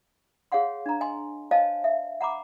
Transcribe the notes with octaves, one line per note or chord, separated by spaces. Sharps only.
G#4 C#5 F5 F#5 C6
D4 A#5
D#5 G#5 C6
C5 C#5 D#5 F5 G#5 A5
E5
F#5 A#5 B5 D6